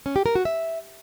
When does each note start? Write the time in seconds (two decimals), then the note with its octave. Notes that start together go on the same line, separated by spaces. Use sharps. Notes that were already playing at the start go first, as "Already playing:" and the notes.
0.06 C#4
0.16 G4
0.26 A#4
0.35 F#4
0.45 E5